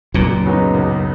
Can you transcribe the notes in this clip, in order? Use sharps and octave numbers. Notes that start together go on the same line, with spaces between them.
C#2 F#2 A#2
C#3 F#3 B3 D#4
C#2